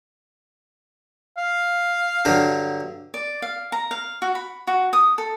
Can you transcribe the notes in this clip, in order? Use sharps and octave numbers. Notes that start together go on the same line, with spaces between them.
F5
G2 D3 F#3
D5
F5
A#5
F5
F#4
B5
F#4
D#6
A4